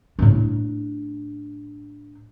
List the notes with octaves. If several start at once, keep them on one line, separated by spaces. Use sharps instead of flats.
A2 D4